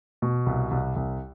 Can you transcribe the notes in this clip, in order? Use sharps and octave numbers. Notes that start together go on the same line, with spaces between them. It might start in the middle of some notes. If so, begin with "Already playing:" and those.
B2
C2
C2
C2